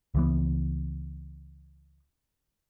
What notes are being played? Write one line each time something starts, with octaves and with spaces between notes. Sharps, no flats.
C#2 E3 B3